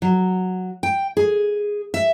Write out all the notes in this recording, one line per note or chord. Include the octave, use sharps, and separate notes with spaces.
F#3
G5
G#4
E5